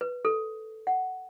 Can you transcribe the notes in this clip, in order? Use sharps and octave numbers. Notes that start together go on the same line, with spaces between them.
B4
A4
F#5